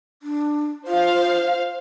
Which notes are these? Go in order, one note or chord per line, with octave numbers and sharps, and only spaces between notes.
D4
F4 C5 F5